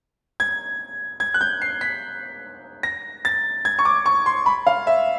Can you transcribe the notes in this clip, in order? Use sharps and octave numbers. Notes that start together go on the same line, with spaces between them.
G#6
G#6
F#6
G6
C7
B6
A#6
A6
G#6
C#6
D6
C#6
C6
B5
F5
E5